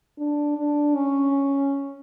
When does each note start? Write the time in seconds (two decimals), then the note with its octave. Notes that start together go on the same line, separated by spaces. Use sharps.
0.18 D4
0.57 D4
0.95 C#4